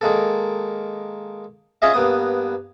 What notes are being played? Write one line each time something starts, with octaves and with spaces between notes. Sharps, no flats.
D#3 G#3 A#3 A4
C#4 F4 G#4 D#5 E5
G2 A#3 B3 D#6